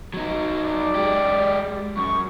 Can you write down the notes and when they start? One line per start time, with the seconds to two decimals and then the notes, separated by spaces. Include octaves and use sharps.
0.14 F#3 D#4
0.62 D5
0.95 G#3 G4
1.97 F#2 C#6